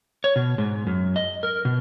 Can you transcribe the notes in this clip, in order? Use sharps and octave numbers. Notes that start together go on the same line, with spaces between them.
C#5
B2
G#2
F#2
D#5
A#4
B2